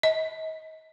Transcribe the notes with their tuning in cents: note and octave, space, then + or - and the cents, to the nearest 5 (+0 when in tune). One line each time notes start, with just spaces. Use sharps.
D#5 +30